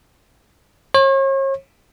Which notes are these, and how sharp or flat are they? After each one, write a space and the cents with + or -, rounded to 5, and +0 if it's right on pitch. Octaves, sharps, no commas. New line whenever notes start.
C#5 -40